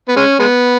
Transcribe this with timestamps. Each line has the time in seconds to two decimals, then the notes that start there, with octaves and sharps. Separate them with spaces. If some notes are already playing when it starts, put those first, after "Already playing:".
0.09 B3
0.16 G#3 C#4
0.39 G#3 B3